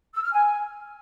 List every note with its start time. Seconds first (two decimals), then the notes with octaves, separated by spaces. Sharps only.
0.14 E6
0.23 F6
0.32 G#5